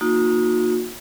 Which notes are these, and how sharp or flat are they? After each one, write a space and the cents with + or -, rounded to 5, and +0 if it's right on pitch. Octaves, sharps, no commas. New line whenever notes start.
A#3 +0 D#4 +0 F#4 -40